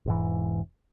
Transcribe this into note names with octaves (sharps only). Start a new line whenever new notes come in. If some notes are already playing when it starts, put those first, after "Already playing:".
E1 G#2 E3